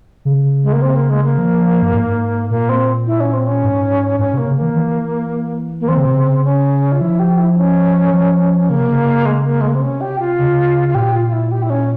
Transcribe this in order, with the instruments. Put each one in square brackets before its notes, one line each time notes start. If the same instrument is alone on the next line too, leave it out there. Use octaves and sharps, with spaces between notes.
[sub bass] C#3
[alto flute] G#3
A#3
C4
A#3
G#3
A#3
[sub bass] F3
G2
G#2
[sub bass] A#2 [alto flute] A#3
[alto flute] C4
E4
C#4
C4
C#4
[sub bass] G#2
[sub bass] G#2 [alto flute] C#4
[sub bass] C3 [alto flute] A#3
[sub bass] C#3
[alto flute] A#3
[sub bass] E3
E3
[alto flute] A#3
[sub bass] E3 [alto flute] C4
[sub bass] C#3
C3
C#3
[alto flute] C#4
F4
[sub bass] F3 [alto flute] E4
[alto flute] G4
E4
E4
C#4
[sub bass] F3
[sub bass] C#3 [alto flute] A#3
[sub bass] C3
C#3
[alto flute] G#3
A#3
G#3
A#3
C4
[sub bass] C3 [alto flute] C#4
[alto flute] G4
F4
[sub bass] C#3
[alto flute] F4
[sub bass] A#2 [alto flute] G4
[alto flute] F4
F4
E4
G4
E4
C#4